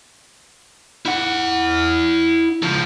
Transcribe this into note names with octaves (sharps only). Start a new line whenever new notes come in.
E4 F#5
C#2 F3